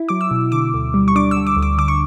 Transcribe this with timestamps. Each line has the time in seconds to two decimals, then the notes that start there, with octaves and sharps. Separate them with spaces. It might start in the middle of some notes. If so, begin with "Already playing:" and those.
Already playing: E4
0.09 F#3 D6
0.21 E6
0.31 B2
0.52 D3 D6
0.74 D2
0.94 G3
1.08 C#6
1.15 D4 D6
1.31 E6
1.36 D3
1.47 D6
1.57 D2
1.63 D6
1.78 D3 D6
1.88 C#6